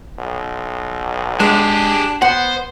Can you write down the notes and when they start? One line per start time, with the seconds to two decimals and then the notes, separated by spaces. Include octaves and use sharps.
0.19 B1
1.40 G#3 D4 G4 G#4
2.22 B3 C5 F#5